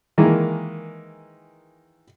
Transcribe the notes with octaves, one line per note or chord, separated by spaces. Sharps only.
D#3 E3 G#3 A#3